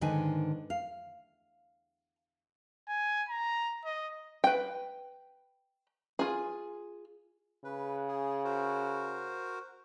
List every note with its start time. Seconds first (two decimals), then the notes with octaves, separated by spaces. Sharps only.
0.01 G#2 D3 D#3 B4 C5 G#5
0.70 F5
2.88 G#5
3.29 A#5
3.85 D#5
4.44 B4 G5
6.19 F4 G#4
7.65 C#3 B4
8.08 G#4
8.45 F#4 A#4 C5